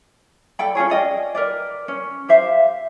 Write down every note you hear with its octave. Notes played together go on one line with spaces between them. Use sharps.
A4 D5 G5 B5
C#4 F4 G#4 C#5
D5 D#5 G5
A#4 B4 D5
C#4
G4 C5 E5 F5